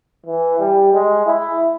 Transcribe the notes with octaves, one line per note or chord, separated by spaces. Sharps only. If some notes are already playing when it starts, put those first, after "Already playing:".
E3
G3
G#3
E4